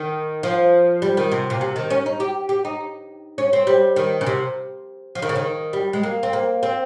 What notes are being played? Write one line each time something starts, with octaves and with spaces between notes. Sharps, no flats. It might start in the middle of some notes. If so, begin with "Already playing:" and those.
Already playing: D#3
F3
G3
D#3
C3
A#2
C3
D#3
C#4
D#4
G4
G4
D#4
C#4
C4
G3
D#3
C#3
C3
F3
D#3
C#3
D#3
G3
G#3
A#3
C4
A#3
C4